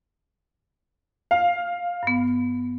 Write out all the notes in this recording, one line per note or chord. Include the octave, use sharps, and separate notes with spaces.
F5
G2 B3